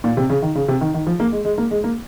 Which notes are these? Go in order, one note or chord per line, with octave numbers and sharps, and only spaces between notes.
A#2
C3
C#3
D#3
C#3
C3
D#3
D#3
F3
A#3
G#3
G#3
A#3
G#3
A#3